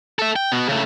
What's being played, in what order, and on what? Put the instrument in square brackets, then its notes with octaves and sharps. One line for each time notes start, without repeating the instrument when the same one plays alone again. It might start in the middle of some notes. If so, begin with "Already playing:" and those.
[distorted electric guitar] A4 E5
G5
B2 B3
C#3 A3